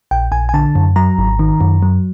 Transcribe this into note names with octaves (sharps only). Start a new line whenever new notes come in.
A#1 G5
A#1 G#5
G#5
D3 A5
F#2
F#3 A#5
G#1
D#3
F#2
F#3